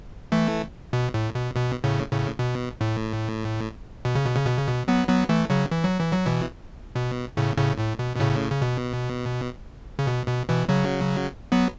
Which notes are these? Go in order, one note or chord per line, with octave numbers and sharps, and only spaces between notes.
E3 A3
B2
A2
B2
B2
A2 C#3
A2 C#3
B2
A2
B2
C#3
B2
C#3
B2
C#3
B2
F#3 B3
F#3 B3
E3 A3
C#3 F#3
E3
F#3
E3
F#3
B2 E3
B2
A2 C#3
A2 C#3
A2
B2
B2
A2 C#3
C#3
B2
C#3
B2
B2
B2 E3
C#3 F#3
F#3 B3